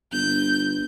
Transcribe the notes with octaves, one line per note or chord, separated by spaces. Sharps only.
G1 G6